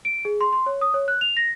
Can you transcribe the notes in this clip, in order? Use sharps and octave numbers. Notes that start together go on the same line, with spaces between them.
D7
G#4
C6
C6
C#5
D#6
C#5
F#6
F7
A#6